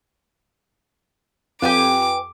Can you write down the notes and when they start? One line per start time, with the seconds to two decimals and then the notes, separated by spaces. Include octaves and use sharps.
1.62 F2 G4 B4 G5 G#5 D6